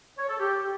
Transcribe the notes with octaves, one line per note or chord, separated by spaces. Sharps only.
C#5
A4
G4